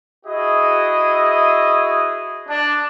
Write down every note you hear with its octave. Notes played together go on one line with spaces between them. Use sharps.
E4 F#4 G#4 D#5
D4